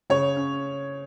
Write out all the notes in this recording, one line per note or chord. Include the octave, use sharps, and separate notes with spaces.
C#3 C#5
C#4